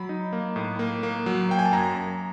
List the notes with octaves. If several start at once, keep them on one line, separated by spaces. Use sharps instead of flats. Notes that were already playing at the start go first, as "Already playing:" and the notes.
Already playing: F#3 B5
D#4
A#3
A2
A#3
A#3
F#3
A#3 G5
G#5
A5
F#2 A#5
F#2